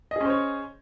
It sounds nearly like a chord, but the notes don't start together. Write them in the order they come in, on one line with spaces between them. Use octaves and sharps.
D#5 G#4 C#4 C5 C#5